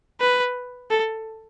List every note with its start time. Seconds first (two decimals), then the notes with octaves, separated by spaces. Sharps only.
0.21 B4
0.90 A4